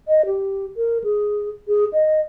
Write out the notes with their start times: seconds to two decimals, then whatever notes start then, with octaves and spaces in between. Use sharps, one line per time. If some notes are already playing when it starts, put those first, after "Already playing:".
0.08 D#5
0.26 G4
0.77 A#4
1.04 G#4
1.68 G#4
1.93 D#5